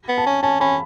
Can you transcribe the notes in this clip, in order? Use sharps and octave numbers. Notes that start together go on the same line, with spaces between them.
B3
A5
C#4
C#4 A5
C#4 B5